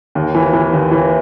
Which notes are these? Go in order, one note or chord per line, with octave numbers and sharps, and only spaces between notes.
D#2
E3
E3
D#2
E3